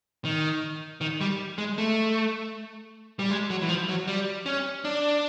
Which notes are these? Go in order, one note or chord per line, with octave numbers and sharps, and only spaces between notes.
D#3
D#3
G3
G#3
A3
G3
G#3
F#3
E3
F3
F#3
G3
C#4
D4